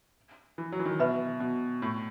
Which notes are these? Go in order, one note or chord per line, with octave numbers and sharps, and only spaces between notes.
E3
F#3
E3
D#3
B2 B4 E5 B5
B2
A2